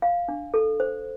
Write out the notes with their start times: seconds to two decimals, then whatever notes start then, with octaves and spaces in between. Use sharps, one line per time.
0.02 F5
0.28 D4
0.54 A4
0.80 C5